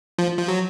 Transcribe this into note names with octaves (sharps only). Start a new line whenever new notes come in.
F3
F3
F#3